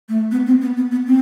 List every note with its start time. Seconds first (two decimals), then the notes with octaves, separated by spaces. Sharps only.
0.09 A3
0.31 B3
0.46 C4
0.61 B3
0.76 B3
0.91 B3
1.06 C4